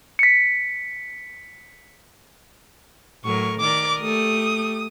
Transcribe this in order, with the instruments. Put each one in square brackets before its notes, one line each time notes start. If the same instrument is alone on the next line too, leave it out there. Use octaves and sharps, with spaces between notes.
[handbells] B6 C#7
[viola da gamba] A2 F#3 A#4 [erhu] C#6
[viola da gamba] D#3 A#4 D5 [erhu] D6
[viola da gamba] A3 G4 [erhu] D#6